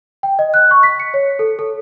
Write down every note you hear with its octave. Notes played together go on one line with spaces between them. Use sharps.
G5
D#5
F#6
C#6
B6
C#7
C#5
A4
A4